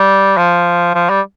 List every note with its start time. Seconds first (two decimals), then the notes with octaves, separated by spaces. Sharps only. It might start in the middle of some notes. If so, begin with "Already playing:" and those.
Already playing: G3
0.37 F3
0.95 F3
1.10 G3